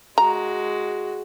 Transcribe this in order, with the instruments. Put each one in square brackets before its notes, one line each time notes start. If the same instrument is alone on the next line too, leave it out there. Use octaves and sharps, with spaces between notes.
[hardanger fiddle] G#3 F#4 [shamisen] A#5